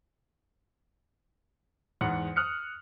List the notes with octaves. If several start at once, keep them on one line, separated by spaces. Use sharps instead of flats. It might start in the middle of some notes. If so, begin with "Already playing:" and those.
E2 G#2 F#5 C#7
D#6 F6 F#6 C#7